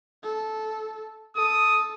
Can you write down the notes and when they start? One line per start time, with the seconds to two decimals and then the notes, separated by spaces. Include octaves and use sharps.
0.23 A4
1.36 A4 D#6